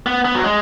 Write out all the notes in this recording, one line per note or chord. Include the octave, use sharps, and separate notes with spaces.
B3
B3
F#3
G#3